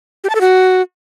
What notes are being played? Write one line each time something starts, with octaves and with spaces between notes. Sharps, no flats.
G4
A5
A4
F#4